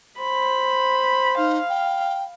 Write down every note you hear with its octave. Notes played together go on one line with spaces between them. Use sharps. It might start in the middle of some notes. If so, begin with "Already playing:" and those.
C5 B5
D#4 F5
G5